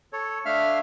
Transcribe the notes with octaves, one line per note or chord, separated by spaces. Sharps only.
A4 C#5
A3 D4 E5 F5 F6